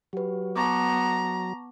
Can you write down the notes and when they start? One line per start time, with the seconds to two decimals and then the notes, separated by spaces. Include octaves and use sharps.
0.13 F#3 G4 B4
0.56 B3 A5 A#5 C#6 D6